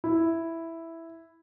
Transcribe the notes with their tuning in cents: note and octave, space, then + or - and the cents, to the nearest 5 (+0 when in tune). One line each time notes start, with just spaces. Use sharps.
E4 +0